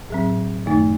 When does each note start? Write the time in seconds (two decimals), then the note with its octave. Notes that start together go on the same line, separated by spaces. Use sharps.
0.10 A2 F#3 C4
0.66 F#2 D#3 A3 D#4